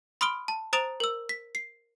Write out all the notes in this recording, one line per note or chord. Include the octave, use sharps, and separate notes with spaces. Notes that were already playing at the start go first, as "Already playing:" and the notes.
B5 C6 D#6 F6 D7 G7
A5
C5 A#5 D#6 A6 D7 F7
A#4 E6
B6
C7